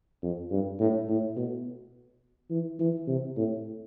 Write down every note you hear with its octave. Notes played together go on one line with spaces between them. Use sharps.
F2
G2
A2
A2
B2
E3
E3
C3
A2